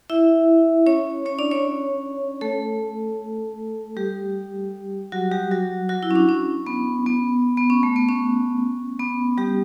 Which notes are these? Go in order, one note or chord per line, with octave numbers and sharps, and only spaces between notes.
E4 E5
C#4 C#5
C#4 C#5
D4 D5
C#4 C#5
A3 A4
G3 G4
F#3 F#4
G3 G4
F#3 F#4
F#3 F#4
E4
C#4
D4
C#4
B3
B3
B3
C#4
A3
B3
C#4
B3
G3 G4